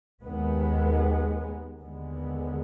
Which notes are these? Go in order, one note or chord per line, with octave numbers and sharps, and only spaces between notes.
D#2 D#3 G#3 B3
D#2 D3 G#3 B3